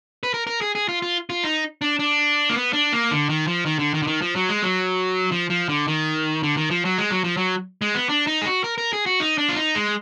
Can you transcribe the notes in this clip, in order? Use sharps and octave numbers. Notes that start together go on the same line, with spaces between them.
B4
A#4
A#4
G#4
G#4
F4
F4
F4
D#4
D4
D4
A#3
B3
D4
A#3
D3
D#3
F3
D#3
D3
D#3
D3
D#3
F3
F#3
G#3
F#3
F3
F3
D3
D#3
D3
D#3
F3
F#3
G#3
F#3
F3
F#3
G#3
B3
D4
D#4
G#4
F#4
A#4
A#4
G#4
F#4
D#4
D4
F4
D#4
G#3